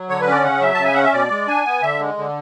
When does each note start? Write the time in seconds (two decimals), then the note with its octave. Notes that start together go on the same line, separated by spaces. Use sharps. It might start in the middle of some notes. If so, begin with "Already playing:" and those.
Already playing: F#3
0.09 D3 C#5
0.21 B4
0.26 C#4
0.32 D5
0.44 C#3 F#5
0.61 F#3 E5
0.74 C#3 A5
0.84 G#5
0.94 C#4 F#5
1.03 E5
1.13 B2 D5
1.31 G#3
1.47 D4 G#5
1.65 B3
1.82 D3 E5
1.99 G#3
2.18 D3